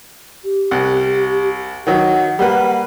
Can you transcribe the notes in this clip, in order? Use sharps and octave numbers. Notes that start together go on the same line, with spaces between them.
G4
C2 F#5
D#3 F#3 F#5
G3 A#3 B4